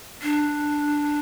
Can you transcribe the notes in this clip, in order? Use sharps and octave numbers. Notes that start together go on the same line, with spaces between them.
D4